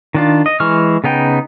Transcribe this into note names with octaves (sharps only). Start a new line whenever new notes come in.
D#3 D4 F4
D#5
E3 G#3 C#6 F6
C#3 B3 D#4 G5